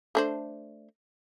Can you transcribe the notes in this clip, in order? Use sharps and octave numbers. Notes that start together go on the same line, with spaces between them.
A3 D4 C5